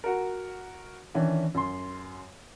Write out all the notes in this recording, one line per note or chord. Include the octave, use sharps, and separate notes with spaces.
F#4 A#4
D#3 E3 C#4 D4
F#2 C6